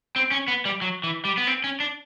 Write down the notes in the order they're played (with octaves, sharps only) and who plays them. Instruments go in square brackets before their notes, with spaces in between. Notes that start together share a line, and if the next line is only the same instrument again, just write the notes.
[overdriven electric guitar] C4
C#4
B3
G3
F#3
E3
G3
B3
C4
C#4
D4